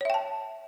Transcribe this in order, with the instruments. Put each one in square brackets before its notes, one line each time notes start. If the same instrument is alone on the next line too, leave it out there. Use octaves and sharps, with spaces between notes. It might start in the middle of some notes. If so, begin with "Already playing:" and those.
[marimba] C#5
E5
G5
A5